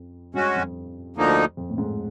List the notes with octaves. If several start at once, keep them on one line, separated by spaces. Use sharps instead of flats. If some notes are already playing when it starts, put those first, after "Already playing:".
Already playing: F2
G2 G#3 C#4 F#4
F2
D2 D3 F3 A#3 D#4
F2
A2
G#2